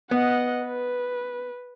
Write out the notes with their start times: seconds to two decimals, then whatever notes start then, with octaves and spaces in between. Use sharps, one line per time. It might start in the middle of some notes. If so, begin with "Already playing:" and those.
0.11 B3 D#5 F#5
0.64 B4